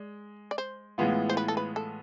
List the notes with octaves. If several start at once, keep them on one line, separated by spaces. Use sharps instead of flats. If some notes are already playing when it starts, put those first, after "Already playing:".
Already playing: G#3 D5
D5
C5
A2 E3 G#3 B3 F4
C5
B4
A4
B4
A4